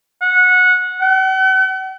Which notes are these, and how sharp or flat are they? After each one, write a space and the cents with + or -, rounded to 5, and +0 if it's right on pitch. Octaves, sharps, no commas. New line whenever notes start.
F#5 -20
F#5 +45